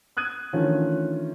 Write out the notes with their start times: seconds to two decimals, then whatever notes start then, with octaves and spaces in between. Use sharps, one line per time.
0.17 D#6 F#6 G#6 D#7
0.53 D#3 E3 A3 C#4 D4 F4